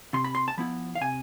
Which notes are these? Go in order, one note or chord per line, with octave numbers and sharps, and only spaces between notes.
C3 C6
B5
C6
A5
F3 B3 E4 B5
F5
C3 G#5